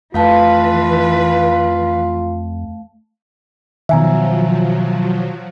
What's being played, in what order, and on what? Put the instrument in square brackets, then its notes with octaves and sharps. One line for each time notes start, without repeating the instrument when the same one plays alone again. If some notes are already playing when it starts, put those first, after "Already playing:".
[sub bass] F2 [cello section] E3 B4 [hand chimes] A3 F5 A5 [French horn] F4
[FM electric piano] B2 D#3 [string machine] F3 F#3 [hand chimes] E5 G#5 A#5